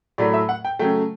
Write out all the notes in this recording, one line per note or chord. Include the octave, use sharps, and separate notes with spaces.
A2 F#3 A3 D5
E5
F#5
G5
C#3 F#3 A3 G5